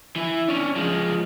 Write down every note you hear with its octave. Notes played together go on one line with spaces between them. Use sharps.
E3 E4
C#4 D4
F3 G#3